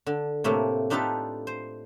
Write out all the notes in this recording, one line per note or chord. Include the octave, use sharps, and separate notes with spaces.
D3
A2 C3 A3 A#3
D4 D#4 F4 G4 A4 B4
C5